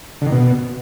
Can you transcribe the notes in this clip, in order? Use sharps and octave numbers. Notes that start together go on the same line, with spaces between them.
D3
D#3
B2